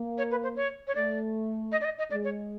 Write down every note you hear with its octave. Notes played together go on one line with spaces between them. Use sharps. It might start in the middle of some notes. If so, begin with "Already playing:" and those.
Already playing: A#3
C#5
B4
C5
C#5
C#5
A3 D5
D#5
D5
D#5
D#5
G#3 D5
C#5